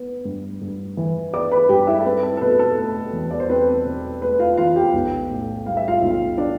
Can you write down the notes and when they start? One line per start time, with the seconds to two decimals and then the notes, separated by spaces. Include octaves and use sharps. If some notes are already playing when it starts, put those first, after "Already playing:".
Already playing: B3
0.25 G2
0.61 G2
0.97 E3
1.33 B3 D5 D6
1.51 B4 B5
1.69 G2 G4 G5
1.87 E4 E5
2.00 A4
2.05 C4 B4
2.23 A4
2.37 A4
2.41 B2 B4
2.59 A4
2.77 A3
3.13 E2
3.31 D5
3.40 C5
3.49 C4 B4
3.85 B2
4.21 A3 B4
4.39 F4 F5
4.57 E2 F4 F5
4.76 G4 G5
4.93 B1
5.29 A2
5.66 G3 F5
5.77 E5
5.88 F4 F5
6.02 B1
6.38 D4 D5